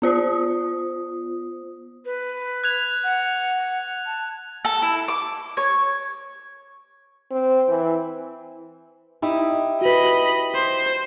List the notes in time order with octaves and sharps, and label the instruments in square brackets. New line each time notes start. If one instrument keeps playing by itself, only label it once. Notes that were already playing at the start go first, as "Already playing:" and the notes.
[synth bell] B3 F4 C5 D#6
[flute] B4
[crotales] F#6 G#6 F7
[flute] F#5
A5
[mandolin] A4
E4
D6
C#5
[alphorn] C4
E3
[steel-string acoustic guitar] D#4 E4 G4
[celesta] F#4 B4 [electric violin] D#5 B5
[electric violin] C5